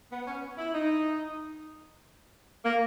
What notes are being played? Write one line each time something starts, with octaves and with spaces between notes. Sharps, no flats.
B3
C#4
E4
D#4
A#3